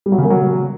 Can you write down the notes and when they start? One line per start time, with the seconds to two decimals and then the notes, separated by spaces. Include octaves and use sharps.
0.06 G3
0.12 F#3
0.18 C#3
0.24 A#3
0.30 F#3